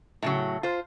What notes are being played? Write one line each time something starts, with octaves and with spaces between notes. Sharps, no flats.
A2 C#3 F#3
F4 C5